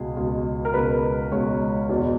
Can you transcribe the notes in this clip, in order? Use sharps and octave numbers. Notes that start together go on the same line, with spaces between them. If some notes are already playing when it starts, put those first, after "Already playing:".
Already playing: C#2 B2 G#3 G#4
C#2 B2 G#3
A#4
C#2 B2 G#3 B4
C#2 B2 G#3 C#5
E2 B2 G#3